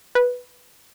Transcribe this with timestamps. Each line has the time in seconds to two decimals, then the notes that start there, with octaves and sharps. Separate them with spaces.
0.15 B4